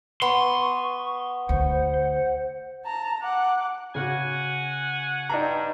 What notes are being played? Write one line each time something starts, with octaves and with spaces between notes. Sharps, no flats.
B3 C6 C#6
D2 C5 F#5
A5 A#5
F#5 D6
C#3 F#4 F#5 G#5
G2 D#4 A#5